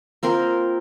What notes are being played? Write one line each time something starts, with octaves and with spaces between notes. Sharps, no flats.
A#3 C4 F4 A#4